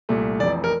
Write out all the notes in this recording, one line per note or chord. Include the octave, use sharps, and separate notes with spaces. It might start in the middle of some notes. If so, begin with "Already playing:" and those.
C2 A#2 A3
F1 F2 E3 D5
A#4